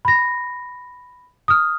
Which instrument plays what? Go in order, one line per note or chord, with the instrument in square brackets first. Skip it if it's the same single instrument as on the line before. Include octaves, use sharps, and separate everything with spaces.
[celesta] B5 A#6
D#6 F6